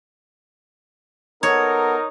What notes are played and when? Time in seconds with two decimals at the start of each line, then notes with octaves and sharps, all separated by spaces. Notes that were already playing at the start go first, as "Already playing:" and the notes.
1.43 B3 D#4 A4 A#4 C#5